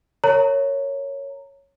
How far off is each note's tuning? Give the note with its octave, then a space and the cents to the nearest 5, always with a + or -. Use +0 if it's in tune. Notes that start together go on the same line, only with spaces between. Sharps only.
A#4 -25 C#5 +0 A#5 -20